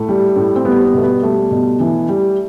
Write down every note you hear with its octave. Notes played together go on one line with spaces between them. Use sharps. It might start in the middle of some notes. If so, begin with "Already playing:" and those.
Already playing: A2 A3
G3
A2
C4
G3 B3
B3
B2 A3
B3
G3 A3
B2
E3
G3